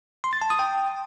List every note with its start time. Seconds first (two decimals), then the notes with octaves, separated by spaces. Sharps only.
0.24 C6
0.33 A6
0.42 A5
0.50 D#6
0.59 G5